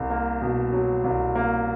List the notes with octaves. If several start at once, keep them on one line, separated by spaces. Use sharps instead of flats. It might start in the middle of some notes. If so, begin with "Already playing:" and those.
Already playing: C2
A#3
B2
F#3
C2
A#3